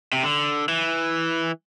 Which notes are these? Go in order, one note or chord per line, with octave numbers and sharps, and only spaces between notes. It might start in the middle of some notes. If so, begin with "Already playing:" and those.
C3
D3
E3